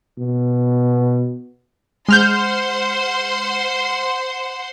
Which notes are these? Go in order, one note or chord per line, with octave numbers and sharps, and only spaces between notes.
B2
G#3 C5 F#5 C6 F6 G6